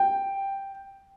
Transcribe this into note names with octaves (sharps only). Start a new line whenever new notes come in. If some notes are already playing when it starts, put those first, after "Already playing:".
Already playing: G5